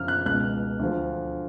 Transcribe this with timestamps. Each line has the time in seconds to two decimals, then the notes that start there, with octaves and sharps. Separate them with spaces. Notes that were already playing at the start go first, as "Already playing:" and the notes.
Already playing: F#2 F3 F6
0.08 F#6
0.26 C#2 B2 F#6
0.80 D2 D3 F3